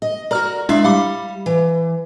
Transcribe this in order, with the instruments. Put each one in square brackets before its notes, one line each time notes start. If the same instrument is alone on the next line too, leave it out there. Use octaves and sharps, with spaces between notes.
[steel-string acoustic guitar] D#5
[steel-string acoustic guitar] F#4 A#4 [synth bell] D5 A#5 F6
[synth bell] G#3 D4 E4 [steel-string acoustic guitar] D5 E5 F5
[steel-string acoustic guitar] G3 [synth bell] F5 B5 D6
[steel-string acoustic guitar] E3